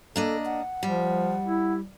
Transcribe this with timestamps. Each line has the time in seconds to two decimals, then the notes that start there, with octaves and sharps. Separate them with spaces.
0.16 A#3 D4 A4 D#5
0.45 F#5
0.83 F3 G3
1.45 E4